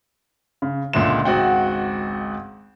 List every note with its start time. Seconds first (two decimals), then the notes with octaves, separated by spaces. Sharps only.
0.62 C#3
0.93 C#2 A#2 D3 G#3 E5 E7
1.25 G#1 C#2 F#4 F#5 G5